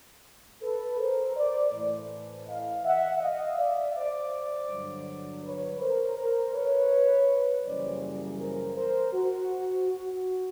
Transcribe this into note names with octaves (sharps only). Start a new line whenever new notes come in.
A4 B4
A#4 C5
C5 D5
A2 E3 A3
D#5 F5
E5 F#5
D#5 F5
D5 E5
C5 D5
G2 D3 F#3
B4 C#5
A#4 C5
A#4 C5
B4 C#5
F#2 C#3 E3 G3 A#3 C5 D5
A#4 C5
A#4 C5
F#4
F#4